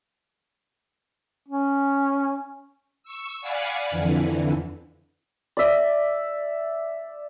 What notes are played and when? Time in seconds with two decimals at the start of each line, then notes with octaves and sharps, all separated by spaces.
1.48 C#4
3.03 C#6 E6
3.41 D5 F5 F#5 G#5 B5
3.90 F2 D3 E3
5.57 D5 E5